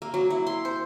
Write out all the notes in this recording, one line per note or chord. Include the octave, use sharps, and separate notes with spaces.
A#3
F#3
E4
C6
C5